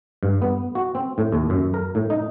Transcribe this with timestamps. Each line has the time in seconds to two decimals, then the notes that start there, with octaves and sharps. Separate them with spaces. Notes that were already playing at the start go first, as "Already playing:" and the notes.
0.23 G2
0.42 B3
0.75 F#4
0.95 C4
1.18 A2
1.32 D#2
1.50 F#2
1.74 A#4
1.95 A2
2.10 D#4